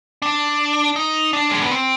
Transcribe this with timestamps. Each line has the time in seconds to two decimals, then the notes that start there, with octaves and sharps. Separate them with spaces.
0.22 D4
0.96 D#4
1.33 D4
1.51 G#3
1.62 B3
1.71 C4